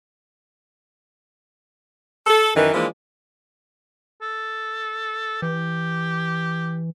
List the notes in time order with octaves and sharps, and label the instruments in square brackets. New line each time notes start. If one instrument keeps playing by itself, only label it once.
[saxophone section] A4
F#2 D#3 E3 A#4 B4
E3 F3 G#3 A#3 D4
[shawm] A4
[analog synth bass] E3 [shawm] G4